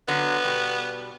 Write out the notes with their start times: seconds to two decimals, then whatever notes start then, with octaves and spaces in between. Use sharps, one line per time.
0.08 D3 F#3 B3
0.45 B2 G3